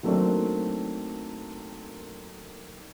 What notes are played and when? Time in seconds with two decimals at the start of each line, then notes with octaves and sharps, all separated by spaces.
0.03 D#3 F#3 A3 A#3 C4 D4